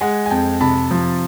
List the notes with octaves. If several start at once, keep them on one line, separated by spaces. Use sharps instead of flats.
G#3 F#5 G#5
G#5
F2 G5 A5
C3 A5 B5
F3